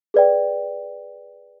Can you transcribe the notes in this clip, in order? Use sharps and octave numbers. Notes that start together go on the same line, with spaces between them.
G#4 B4 D5 G5